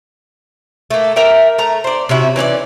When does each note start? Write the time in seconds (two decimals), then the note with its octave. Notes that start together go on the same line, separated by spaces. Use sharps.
0.91 A3 A#3
1.16 A#4 E5 G5
1.58 A3 A#5
1.84 C5 D5
2.09 C3 C#4 E4 F#4
2.36 E3 C#4 D#4 D5